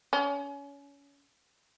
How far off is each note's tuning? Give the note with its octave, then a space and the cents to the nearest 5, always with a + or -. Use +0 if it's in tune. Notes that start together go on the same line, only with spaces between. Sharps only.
C#4 +30